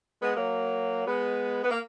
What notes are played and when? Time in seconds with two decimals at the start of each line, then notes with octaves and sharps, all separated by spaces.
0.22 G#3 B3
0.36 F#3 A#3
1.07 G#3 B3
1.63 B3
1.71 A#3